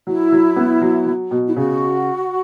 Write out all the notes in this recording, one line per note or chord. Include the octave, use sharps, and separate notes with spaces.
F#3 E4
F#3
B3
F#3
F#3
B2
E4
C#3 F#4